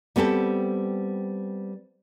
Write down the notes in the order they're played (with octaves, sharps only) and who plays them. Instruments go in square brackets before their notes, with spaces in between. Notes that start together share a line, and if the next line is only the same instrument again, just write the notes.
[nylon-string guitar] G3 B3 C4 G#4 A4